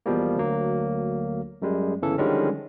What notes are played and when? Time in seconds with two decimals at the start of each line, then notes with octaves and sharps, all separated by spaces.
0.06 E2 B2 F3 G3 A#3
0.37 D2 F#3 A#3
1.62 F#2 G3 G#3
2.02 G1 C#3 E3 A4
2.18 D3 D#3 F3 G3 G#3 C#4